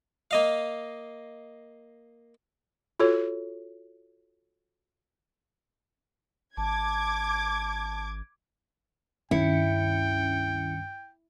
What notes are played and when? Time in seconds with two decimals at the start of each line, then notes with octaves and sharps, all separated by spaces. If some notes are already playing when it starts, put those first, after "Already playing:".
0.31 A#3 D#5 F5
3.00 F4 F#4 A4 C#5
6.57 G#1 A5 D6 G#6
9.31 C#2 G2 D#3 C#4 E4 G5 C#7